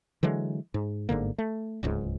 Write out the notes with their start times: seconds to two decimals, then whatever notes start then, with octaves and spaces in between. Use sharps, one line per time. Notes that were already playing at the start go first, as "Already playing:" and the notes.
0.23 D3 E3 F#3 G#3
0.74 G#2
1.09 G1 G#2 D3 A#3
1.38 A3
1.83 D1 C#2 G#2